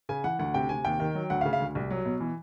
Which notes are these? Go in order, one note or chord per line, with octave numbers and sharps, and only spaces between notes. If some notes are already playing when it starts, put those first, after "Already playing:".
C#3 G#5
E3 F#5
D2 F#5
C3 G5
C3 G#5
D#2 G5
D#3
F#3
D2 F#5
F5
C#3
F5
D2
C2
F#3
B2
E3